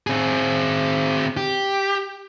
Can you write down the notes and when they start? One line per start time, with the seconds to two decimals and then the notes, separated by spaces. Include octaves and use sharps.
0.07 C4 G#4
1.37 G4